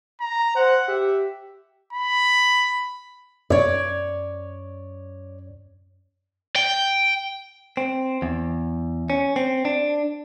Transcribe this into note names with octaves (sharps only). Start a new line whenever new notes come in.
A#5
C5 F#5
G4 E5
B5
F#2 C#5 D5
G5
C4
E2
C#4
C4
D4